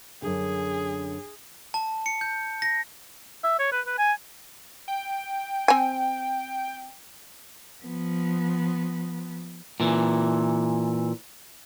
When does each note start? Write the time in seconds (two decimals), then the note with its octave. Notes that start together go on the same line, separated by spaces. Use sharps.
0.22 F#2 D3 G#4
1.74 A5
2.06 C#7
2.21 G6
2.62 A#6
3.44 E5
3.59 C#5
3.72 B4
3.87 B4
3.98 G#5
4.88 G5
5.68 C4 G#5
7.84 F3 B3
9.80 A#2 E3